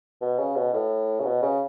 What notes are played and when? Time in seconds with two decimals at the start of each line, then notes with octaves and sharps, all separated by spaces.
0.21 B2
0.38 C#3
0.56 B2
0.74 A2
1.20 C#3
1.25 B2
1.43 C#3